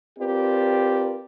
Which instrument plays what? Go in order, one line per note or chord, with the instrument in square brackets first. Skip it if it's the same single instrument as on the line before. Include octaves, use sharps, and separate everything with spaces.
[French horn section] C4 F4 G4 A#4 B4 D5